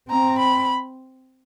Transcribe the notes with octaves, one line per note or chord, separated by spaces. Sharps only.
C4 A#5
B5